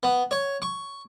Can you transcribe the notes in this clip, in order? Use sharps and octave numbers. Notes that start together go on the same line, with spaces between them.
B3
C#5
C#6